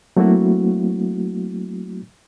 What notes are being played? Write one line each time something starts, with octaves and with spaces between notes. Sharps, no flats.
F#3 A3 A#3 C4 E4 F#4